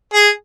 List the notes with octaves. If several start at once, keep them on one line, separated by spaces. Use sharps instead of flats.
G#4